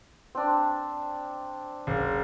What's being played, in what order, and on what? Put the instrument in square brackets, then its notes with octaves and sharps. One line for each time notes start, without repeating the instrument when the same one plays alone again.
[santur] C4 D4
[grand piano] F#1